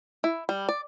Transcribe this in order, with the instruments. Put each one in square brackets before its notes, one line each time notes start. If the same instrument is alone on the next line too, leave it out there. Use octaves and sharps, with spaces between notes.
[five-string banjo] E4
G3
D5